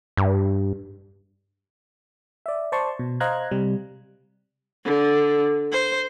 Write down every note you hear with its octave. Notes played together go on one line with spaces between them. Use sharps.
G2
D5 E5
C5 D5 A5 C6 C#6
B2
C5 D#5 F5 A#5 F#6 G#6
C3 G3
D3
C5